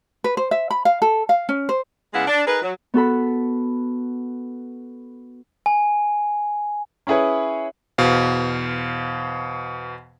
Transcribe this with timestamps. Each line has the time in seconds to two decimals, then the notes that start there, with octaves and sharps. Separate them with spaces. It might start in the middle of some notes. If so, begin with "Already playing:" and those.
0.24 B4
0.37 C5
0.51 E5
0.71 B5
0.85 F5
1.02 A4
1.29 F5
1.49 C#4
1.69 C5
2.14 C#3 G#3 B3 E4 F5 F#5
2.28 D4
2.47 D#4 G#4 A#4 B4
2.62 F#3
2.94 B3 F#4 A4 B5
5.66 G#5
7.07 C#4 E4 G#4 B4 C#5
7.98 E2 B2 C5 F5